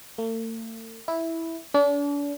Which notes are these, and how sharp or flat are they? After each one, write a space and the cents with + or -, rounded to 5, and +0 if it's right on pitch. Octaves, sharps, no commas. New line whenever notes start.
A3 +45
E4 -5
D4 -40